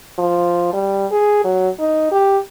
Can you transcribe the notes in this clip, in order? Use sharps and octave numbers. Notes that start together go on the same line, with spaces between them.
F3
G3
G#4
F#3
D#4
G4